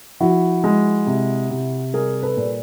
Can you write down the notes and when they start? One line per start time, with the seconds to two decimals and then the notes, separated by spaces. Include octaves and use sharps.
0.20 F3 E4 F#4
0.64 G#3
1.07 C3
1.51 C3
1.93 G3 G#4 A#4
2.23 A4 B4
2.37 A#2